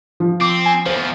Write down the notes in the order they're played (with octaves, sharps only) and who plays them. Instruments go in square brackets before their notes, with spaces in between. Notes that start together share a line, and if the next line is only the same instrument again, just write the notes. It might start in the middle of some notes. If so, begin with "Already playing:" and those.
[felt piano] F3
[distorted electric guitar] C4 [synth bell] D6
[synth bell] G#5
[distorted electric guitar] E2 F3 [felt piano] C5